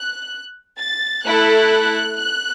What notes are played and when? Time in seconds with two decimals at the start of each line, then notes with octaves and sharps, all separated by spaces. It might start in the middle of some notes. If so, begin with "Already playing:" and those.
Already playing: F#6
0.79 A6
1.25 A3 E4 A4 F#6
2.17 F#6